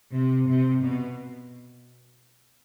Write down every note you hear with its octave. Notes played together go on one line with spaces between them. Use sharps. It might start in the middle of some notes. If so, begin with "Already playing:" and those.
C3
C3
B2